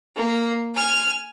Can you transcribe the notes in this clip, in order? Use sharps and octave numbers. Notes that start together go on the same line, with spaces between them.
A#3
G#5 F6